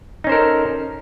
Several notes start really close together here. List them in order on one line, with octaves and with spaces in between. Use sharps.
D#4 C#4 C5 A#4 A4